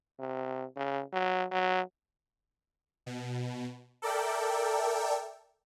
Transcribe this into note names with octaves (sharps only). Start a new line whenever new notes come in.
C3
C#3
F#3
F#3
B2
A4 A#4 D5 E5 G5